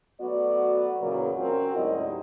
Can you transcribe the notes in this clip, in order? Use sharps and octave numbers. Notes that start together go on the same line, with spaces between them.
F#3 A3 B3 F#4 D5
E2 A#2 C#3 F#3 A#3 A#4
C4 C#4 F4 F#4 A#4
D2 G#2 F#3 G3 E4 D#5